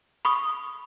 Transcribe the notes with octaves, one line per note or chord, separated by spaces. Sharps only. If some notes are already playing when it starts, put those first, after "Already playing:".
B5 C#6 D#6